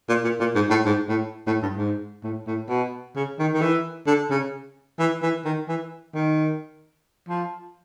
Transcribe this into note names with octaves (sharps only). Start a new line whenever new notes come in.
A#2
A#2
A#2
G#2
A2
G#2
A2
A2
G2
G#2
A2
A2
B2
C#3
D#3
D#3
E3
D3
C#3
E3
E3
D#3
E3
D#3
F3